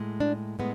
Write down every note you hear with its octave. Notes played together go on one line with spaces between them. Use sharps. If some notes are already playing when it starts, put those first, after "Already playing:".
Already playing: A2 G#3
D4
A2 G#3 B3